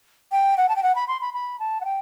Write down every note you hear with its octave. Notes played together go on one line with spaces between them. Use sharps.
G5
F#5
A5
G5
F#5
B5
C6
B5
B5
A5
F#5
G5